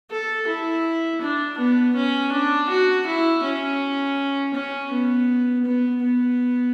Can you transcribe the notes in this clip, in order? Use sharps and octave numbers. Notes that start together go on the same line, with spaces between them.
A4
E4
D4
B3
C#4
D4
F#4
E4
C#4
C#4
B3
B3
B3